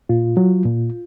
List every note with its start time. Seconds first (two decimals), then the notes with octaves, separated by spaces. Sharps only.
0.09 A#2 F4
0.37 F#3
0.65 A#2